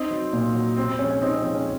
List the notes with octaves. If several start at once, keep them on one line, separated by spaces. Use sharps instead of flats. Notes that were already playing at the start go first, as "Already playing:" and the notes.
Already playing: C4 D#4
F#3
A#2
F#3
C3 C4
C4
F3 G#3 C#4
C#4
C3 C4 D#4
C#4
F3 G#3 C4
C#4